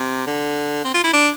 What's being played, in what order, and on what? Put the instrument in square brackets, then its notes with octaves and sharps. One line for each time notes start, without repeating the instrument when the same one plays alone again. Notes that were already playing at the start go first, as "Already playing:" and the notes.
Already playing: [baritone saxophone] C3
D3
C4
F4
E4
D4